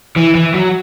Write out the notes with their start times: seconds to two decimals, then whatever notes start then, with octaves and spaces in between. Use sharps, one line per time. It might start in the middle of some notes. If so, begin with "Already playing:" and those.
0.16 E3
0.35 E3
0.54 F#3